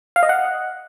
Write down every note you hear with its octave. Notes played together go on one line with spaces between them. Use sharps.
F5
D#5
F#5